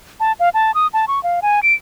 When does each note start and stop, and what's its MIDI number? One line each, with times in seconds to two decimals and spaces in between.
0.20 0.33 81
0.40 0.49 77
0.54 0.74 81
0.74 0.87 87
0.93 1.05 81
1.08 1.22 85
1.23 1.40 77
1.42 1.60 80
1.63 1.74 98